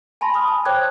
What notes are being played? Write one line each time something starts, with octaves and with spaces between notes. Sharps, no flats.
G#5 A5 B5 C6 A#6
B5 D#6 F6
A5
C5 C#5 G5 D6 F#6 G#6